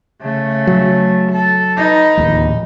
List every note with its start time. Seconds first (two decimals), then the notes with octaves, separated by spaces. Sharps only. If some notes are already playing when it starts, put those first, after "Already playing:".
0.21 C#3 A3
0.67 F#3
1.31 A4
1.76 D#4 B4
2.17 D1 A#1 D#2